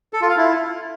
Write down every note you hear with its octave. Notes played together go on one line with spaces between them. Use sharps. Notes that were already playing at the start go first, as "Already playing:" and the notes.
A4
F4
F5
E4